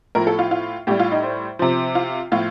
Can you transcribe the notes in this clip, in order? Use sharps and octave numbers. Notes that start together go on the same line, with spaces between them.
A2 F3 A#4
A4
F4
F4
A2 G3 G4
F4
D#4
C5
C3 F3 C5
F4
A2 F3 F4